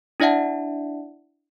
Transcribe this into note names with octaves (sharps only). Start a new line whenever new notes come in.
D4 E4 D5 E5 F#5 A5